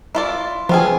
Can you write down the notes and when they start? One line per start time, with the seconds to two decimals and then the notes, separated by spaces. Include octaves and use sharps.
0.15 E4 F4 D5
0.69 F3 B3 C4 G#4